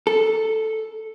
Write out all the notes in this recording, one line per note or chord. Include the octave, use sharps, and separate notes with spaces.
A4